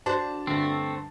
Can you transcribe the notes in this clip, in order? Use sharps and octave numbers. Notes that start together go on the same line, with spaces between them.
D4 F#4 C5 A5
G2 D3 A3 C4